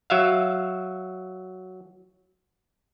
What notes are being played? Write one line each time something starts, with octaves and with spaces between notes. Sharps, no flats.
F#3 E5 F5